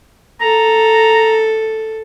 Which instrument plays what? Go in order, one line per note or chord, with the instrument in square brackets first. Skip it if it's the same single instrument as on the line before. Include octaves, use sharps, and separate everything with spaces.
[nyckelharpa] A4 [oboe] A#5